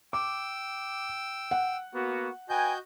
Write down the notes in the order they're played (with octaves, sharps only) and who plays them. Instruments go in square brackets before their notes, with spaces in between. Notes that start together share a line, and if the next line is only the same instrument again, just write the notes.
[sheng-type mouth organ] G5 E6 [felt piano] D6
[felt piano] F#5
[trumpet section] A#3 B3 F#4
[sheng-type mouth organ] F#4 D#5 G6 [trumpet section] B4 G5 G#5